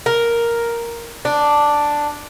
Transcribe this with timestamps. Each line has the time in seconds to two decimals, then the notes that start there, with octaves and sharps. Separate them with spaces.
0.06 A#4
1.25 D4